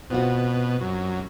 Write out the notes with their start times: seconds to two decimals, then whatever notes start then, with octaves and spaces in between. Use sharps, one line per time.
0.10 B2 C4 F4 F#4
0.81 F#2